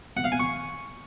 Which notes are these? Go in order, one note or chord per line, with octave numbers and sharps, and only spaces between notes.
F#5
F5
G#5
C#6